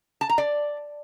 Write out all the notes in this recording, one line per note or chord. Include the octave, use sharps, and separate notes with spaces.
A5
A#5
D5